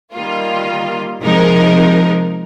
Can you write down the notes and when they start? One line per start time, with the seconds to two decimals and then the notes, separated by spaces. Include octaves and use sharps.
0.13 D#3 G3 A#3 F4
1.22 C3 F3 G#3 D#4 A#4